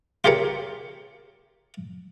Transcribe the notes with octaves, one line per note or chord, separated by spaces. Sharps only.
F4 G4 G#4 A#4 C#5